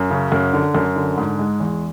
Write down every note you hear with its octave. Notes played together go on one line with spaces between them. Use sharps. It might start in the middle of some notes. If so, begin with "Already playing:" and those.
Already playing: F#2
C#3
F#2
D3
F#2
D3
G#2
G#3
E2